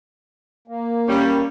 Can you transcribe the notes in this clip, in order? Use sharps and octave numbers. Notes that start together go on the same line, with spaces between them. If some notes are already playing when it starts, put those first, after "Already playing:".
A#3
G3 C#4